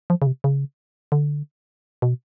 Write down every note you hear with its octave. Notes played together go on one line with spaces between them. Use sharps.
F3
C#3
C3
C#3
D3
B2